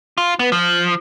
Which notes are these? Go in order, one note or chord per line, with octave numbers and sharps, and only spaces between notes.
F4
B3
F3